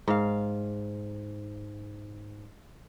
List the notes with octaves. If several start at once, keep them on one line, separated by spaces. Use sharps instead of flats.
G#2 F5